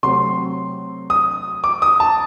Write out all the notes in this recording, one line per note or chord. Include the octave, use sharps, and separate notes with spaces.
C3 F#3 A3 C4 C6
D#6
D6
D#6
A5